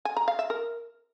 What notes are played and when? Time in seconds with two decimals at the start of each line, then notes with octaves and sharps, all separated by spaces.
0.05 G#5
0.17 A#5
0.28 F5
0.39 E5
0.50 A#4